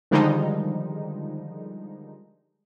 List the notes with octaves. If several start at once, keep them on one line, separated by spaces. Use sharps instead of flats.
D3 D#3 F3 G3 G#3 D#4